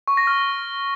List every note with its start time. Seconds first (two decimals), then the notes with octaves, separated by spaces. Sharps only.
0.08 C#6
0.17 A#6
0.27 F6